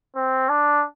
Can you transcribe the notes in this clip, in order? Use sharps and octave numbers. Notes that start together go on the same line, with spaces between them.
C4
D4